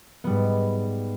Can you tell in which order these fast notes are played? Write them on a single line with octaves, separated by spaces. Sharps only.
B3 G3 G#2